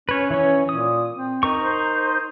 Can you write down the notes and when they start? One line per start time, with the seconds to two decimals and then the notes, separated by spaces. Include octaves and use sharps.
0.09 C#4 B4 C#5
0.30 E3 C#4 C#5
0.69 A#2 D#6
1.14 C4
1.43 D#4 A#4 C#6
1.60 C5